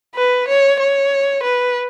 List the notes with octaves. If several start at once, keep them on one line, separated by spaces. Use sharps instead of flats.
B4
C#5
C#5
B4